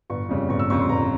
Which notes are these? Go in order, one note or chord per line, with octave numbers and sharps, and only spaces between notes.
G1 C#6
F2 C#3 G3
G1 C#6
E6
F2 C#3 G3 C#6
C6
G1 A#5